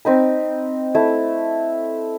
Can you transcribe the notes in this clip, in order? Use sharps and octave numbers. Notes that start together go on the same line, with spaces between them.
C4 D#4 B5
A3 E4